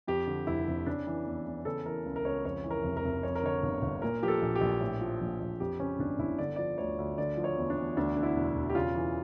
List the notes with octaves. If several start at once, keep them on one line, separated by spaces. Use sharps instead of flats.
F2 G4
D3
F1 E4
F1
C#3 D4
E3
E2
E2
C#3 A4
E3 A#4
C#2
A#4
C#2 C#5
F2 C#5
E3
A#4
F1
A#4
F1
F2 C#5
A#4
D3 C#5
G1
G1
A#2 A#4
F3 G4
A4
A#1
G4
A#1
A2
F3
A#1
A#1
F2 G4
C#3 C#4
G1 D4
G1 E4
D3 D5
F3 D5
D2 C#5
D2
D3 D5
F3
C#5
E2
D4
E2
D2 D4
D3
E4
E1
E1
G4
C#3 F4
E3